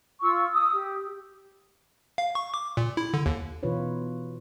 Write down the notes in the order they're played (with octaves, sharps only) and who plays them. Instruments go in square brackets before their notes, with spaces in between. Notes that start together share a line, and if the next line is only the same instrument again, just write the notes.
[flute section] F4 C#6 E6
D#6 E6
G4
[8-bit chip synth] F5
C#6
D6
A#2
E4
D3
D#2
[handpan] B2 E3 D#4 F4 B4 C#5